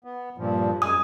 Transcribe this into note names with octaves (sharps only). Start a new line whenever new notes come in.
B3
G2 A#2 F3
F#2 G#3 G#5 D#6